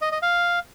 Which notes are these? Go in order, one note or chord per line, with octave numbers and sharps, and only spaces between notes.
D#5
D#5
F5